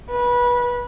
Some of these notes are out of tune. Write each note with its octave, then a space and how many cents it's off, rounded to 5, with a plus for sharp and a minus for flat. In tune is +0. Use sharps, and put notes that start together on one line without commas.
B4 -20